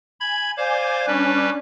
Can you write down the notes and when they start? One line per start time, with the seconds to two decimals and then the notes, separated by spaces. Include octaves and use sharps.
0.20 G#5 B5 G#6
0.57 C5 D5 F5 G#5 G6
1.07 G3 C#4 D4 B4